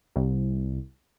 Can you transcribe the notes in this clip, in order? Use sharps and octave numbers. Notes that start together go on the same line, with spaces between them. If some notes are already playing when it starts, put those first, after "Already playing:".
C2